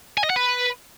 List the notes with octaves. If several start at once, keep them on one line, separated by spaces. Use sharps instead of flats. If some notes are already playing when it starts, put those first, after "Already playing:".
G#5
D#5
F#5
B4